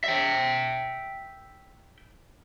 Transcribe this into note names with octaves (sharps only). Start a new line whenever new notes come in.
E5 G5